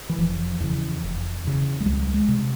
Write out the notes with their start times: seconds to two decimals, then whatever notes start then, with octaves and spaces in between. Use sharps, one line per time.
0.09 E3
0.18 F1 F3
0.61 E2 C#3
1.03 F1
1.44 E2 C#3
1.80 G#3
1.85 C#2 G3
2.14 G#3
2.28 C3